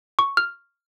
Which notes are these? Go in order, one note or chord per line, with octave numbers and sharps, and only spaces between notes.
C#6
F6